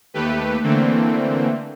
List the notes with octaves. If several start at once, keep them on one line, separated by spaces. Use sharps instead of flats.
D#2 A3 G4 B4
D3 E3 A3 A#3 C4